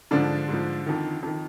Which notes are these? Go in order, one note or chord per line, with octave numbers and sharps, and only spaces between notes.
G#2 D3 F3 D4
G#2 F3
F2 D#3
F2 D#3